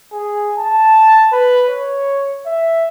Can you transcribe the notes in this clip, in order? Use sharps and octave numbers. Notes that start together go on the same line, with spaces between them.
G#4
A5
B4
C#5
E5